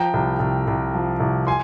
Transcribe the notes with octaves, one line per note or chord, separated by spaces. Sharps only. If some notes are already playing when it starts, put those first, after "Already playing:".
Already playing: F3 G5 A#5
C2
C2
C2
F3
C2
G#5 C6